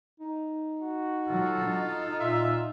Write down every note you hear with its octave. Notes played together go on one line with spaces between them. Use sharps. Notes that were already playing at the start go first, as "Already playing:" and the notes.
D#4
F#4
F#3 F4 A4
D#4
A#2 F4 E5